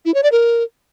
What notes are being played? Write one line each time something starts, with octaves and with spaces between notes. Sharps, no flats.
E4
C#5
D5
A#4